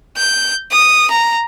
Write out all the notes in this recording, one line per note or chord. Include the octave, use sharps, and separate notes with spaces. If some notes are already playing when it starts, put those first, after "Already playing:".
G6
D#6
A#5